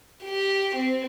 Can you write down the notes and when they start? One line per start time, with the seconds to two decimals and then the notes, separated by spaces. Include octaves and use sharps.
0.24 G4
0.76 C4